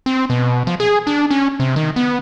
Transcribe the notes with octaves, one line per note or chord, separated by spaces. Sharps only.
C4
B2
F3
G#4
D4
C#4
C3
D#3
B3